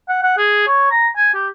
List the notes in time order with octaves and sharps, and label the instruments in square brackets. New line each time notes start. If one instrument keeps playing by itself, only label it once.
[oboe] F#5
F#5
G#4
C#5
A#5
G#5
G4